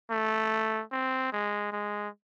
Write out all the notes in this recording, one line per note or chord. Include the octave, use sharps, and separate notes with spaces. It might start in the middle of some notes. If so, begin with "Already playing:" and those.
A3
C4
G#3
G#3